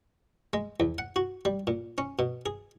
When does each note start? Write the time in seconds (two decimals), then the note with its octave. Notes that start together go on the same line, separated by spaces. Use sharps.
0.53 G#3
0.80 E2
0.98 F#5
1.16 F#4
1.45 G3
1.67 A#2
1.98 C#4
2.19 B2
2.46 G#4